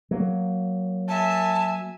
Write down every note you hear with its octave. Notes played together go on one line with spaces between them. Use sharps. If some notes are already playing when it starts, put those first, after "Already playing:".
F#3 A#3
E5 G#5 A5